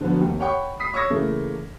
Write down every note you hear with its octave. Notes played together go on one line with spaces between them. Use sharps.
D3 F3 F#3 B3
D#2 C3
C#5 F#5 G5 B5 C#6
B5 D#6 B6 C7
C#5 C#6 D#6 E6 G#6 A#6
C#3 E3 A3 A#3